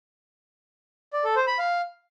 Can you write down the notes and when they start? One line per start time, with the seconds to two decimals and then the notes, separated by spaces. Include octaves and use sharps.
1.13 D5
1.24 A4
1.36 C5
1.47 B5
1.59 F5